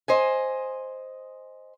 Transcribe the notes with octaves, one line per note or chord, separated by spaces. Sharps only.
C5 D#5 G#5